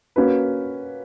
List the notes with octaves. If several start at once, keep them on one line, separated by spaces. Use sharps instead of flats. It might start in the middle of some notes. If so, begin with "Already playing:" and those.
A#3 C#4 F#4 B4